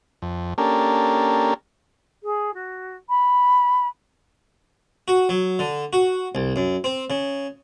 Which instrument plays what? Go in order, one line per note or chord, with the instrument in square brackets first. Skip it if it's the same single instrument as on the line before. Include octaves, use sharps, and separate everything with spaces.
[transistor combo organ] F2
A#3 C#4 D4 G4 A4 A#4
[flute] G#4
F#4
B5
[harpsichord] F#4
F#3
D3
F#4
C2
F#2
C4
C#3